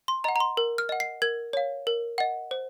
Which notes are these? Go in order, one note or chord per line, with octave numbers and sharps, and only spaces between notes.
C6
D#5 F#5 A#5
A#5
C6
A#4
F6
D#5 F#5
C7
A#4 G#6
C#5 F5
A#4
D#5 F#5
C5